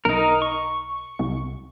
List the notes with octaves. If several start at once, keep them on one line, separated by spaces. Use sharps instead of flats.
B1 D#4 A#4
C#6
C2